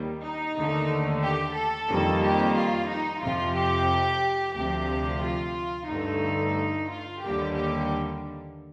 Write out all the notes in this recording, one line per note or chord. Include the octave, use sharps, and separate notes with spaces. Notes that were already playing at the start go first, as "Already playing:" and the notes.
Already playing: D#2 D#3 G3 A#3
D#4
D#2 D3 A3
G4
A4
F2 D#3 G3 A#3
G4
F4
D#4
F2 C3 F3 F4
G4
D2 C3 F3 G4
F4
G2 D3 A3 D#4
F4
D#2 D3 G3 A#3 G4
G4